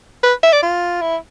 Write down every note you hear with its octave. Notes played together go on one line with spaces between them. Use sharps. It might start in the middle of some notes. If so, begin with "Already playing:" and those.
B4
E5
D5
F4
E4